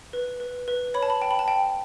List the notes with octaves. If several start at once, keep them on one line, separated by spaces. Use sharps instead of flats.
B4
B4
B4
C#5 B5
A5
B5
G5 A5
B5
A5
G5